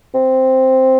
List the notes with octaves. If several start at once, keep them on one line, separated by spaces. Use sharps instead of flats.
C4